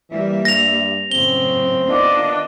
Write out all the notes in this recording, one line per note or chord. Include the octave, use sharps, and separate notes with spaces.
E3 G3 A#3 E5
G2 A#6 F7
F#2 A2 C#3 C4 G7
D#3 B3 D4 F4 D#5